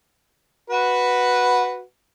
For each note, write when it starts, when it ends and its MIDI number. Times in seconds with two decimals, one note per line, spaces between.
0.70 1.81 66
0.70 1.81 71